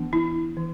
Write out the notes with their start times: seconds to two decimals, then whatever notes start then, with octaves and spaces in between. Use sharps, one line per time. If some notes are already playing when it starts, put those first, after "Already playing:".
Already playing: E3 B3 D4
0.13 E4
0.57 E3